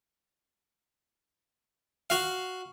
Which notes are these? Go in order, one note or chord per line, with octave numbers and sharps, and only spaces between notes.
F#4 F5